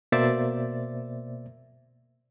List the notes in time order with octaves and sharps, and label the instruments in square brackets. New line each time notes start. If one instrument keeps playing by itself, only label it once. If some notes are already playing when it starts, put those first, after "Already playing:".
[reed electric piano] B2 A#3 C5 D5 E5 A6